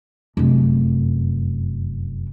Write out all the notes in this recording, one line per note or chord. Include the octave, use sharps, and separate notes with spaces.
F1 F#2